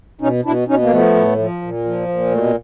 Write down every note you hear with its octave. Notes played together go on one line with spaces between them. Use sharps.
B2 C#4 D#4
B2 D4 E4
B2 C#4 D#4
A#3
F3 A3 B3
A2
F3
A#2
F3
A#2
B2 A3